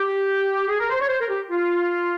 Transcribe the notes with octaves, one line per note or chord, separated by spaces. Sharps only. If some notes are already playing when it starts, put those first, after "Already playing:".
Already playing: G4
G#4
A#4
C5
C#5
C5
A#4
G4
F4